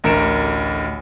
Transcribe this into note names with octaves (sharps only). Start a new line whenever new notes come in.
A1 D2 A#4 C#7 D7 E7